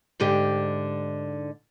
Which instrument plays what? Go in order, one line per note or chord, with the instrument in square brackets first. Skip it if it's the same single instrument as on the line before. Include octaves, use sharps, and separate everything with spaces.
[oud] G#2 D3 G4